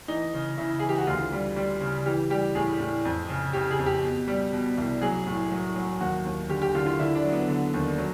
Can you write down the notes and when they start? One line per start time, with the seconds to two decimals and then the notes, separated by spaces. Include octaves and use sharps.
0.08 E3 D#4
0.34 C#3
0.57 C#3 E4
0.79 E3 G#4
0.89 G4
0.98 F#4
1.07 D2 F4
1.32 G3
1.56 G3
1.81 C#3
2.06 E3 G4
2.30 G3 G4
2.55 A2 G#4
2.80 A2
3.05 F2
3.29 C#3
3.53 C#3 G4
3.71 G#4
3.79 F2
3.86 G4
4.04 B2
4.28 G3
4.53 B2
4.78 C2
5.02 F#3 G#4
5.27 A2
5.52 F#3
5.76 F#3
6.00 D#2 F#4
6.25 D#2
6.49 D3 G4
6.62 G4
6.75 D3 F4
6.86 F4
6.99 D3 E4
7.15 D4
7.25 F#3
7.33 B3
7.48 D3
7.74 D#2
7.98 F#3